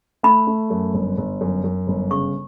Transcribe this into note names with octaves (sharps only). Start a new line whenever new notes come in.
A3 B5
A3
F#2
G1
G1
F#2
F#2
G1
C#3 C#6